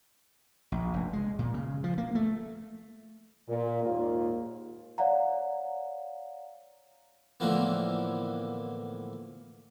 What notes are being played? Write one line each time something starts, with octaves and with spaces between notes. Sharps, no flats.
A#1
F1
G#3
A#2
C#3
F3
A#3
A3
A#2
D#2 G#2 A#3 F4
C#5 D5 F5 F#5 A#5
A2 D3 E3 F3 A#3 B3